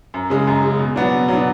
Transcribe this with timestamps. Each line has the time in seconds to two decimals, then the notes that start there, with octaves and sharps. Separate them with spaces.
0.14 F#2
0.30 C#3 G#3
0.47 F#2
0.63 C#3 G#3
0.79 B2
0.96 F#3 B3 D4
1.12 B2
1.28 F#3 B3 D4